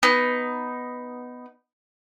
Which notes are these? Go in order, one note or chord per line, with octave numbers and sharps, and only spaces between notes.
B3 D#4